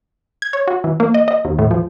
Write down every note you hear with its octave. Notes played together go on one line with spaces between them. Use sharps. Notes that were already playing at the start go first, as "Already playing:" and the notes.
G#6
C#5
F#4
E3
A#3
D#5
D#5
D#2
A2
F3